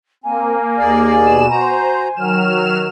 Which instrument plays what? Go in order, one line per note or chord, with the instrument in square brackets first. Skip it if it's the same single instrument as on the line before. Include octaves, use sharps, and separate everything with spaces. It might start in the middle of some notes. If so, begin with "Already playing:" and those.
[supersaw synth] A#3 [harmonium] C4 [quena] G#5
[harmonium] D#2 G#4 D5
[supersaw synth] B2 E7
[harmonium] F#4 A#5 [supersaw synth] C5
[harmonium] D#3 [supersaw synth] F#3 F6 E7